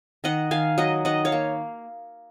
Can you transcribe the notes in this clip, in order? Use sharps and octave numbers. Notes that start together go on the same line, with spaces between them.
D#3 D#5 F#5
D#3 F5 G#5
F#3 D#5 F#5
D#3 D#5 F#5
C#5 F5
A#3